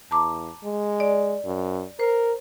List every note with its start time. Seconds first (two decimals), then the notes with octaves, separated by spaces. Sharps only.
0.11 E2 A5 A#5 D6
0.64 G#3
1.00 D5
1.45 F#2
2.00 A#4 C5